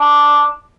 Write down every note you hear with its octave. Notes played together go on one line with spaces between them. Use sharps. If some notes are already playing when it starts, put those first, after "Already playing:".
Already playing: D4